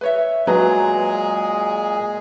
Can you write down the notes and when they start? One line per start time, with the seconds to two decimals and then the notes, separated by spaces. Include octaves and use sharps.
0.01 B4 C#5 E5
0.47 A#2 F#3 G#3 G#4 B4 A#5